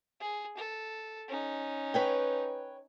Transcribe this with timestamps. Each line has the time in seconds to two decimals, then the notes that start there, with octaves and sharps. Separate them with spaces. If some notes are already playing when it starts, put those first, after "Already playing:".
0.20 G#4
0.57 A4
1.28 C#4 D#4
1.94 B4 C#5 G5